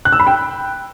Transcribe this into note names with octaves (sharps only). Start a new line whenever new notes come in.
F#6
E6
B5
G5